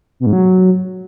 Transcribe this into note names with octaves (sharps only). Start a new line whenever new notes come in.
B2
G#2
F#3